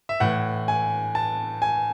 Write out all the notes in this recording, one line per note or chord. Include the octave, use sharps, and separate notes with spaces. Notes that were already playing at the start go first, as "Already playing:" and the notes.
E5
A2 E3 F#5
G#5
A5
G#5